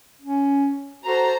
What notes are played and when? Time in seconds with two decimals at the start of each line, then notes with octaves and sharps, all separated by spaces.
0.22 C#4
1.04 F#4 A4 C5 A#5